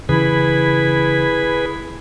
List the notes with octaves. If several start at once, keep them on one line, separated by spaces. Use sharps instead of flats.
C#3 E3 E4 G#4 B4